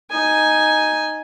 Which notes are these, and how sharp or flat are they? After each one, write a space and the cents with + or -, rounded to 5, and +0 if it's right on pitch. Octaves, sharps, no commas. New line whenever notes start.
D#4 +0 G#5 +0